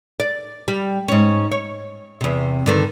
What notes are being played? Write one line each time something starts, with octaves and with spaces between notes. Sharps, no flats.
D5
G3
G#2 C#4
C#5
E2 C3
G2 D3 D#3